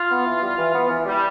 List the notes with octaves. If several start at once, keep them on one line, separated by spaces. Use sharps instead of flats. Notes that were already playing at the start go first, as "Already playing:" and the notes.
Already playing: F4
B3
E3
G3
E3
B3
E3
G3